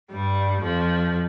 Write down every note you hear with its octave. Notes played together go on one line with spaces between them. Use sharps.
G2 G3
F2 F3